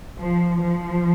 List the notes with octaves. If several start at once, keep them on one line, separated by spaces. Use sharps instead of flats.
F3
F3